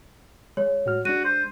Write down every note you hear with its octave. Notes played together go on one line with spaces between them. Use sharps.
G#3 C#5
A2 F#4 F6
G#3 D4 F#4 D#7
C5